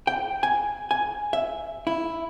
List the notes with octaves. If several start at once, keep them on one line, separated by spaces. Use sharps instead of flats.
G5
G#5
G#5
E5
E4